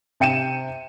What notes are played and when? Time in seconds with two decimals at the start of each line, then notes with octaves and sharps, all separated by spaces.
0.20 C3 G5 C#7 D#7 E7